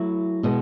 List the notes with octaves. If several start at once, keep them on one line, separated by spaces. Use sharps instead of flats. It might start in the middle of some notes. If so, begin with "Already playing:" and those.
Already playing: F#3 A3 E4
B2 G#3 B3